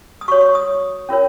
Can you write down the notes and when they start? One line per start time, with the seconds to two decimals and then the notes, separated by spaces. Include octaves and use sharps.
0.21 D#6
0.28 F#4 C#5 C#6
0.41 C#6
0.55 D#6
1.09 C#4 F4 A#4 C#5